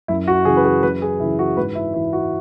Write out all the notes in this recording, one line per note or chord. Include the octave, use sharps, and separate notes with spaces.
F#2 E4
F#4
C#3 E3 G#4
B4
G#4
F#2 B4
G#4
C#3 E3 E4
F#4
G#2 B4
E4
E3 E4
F#4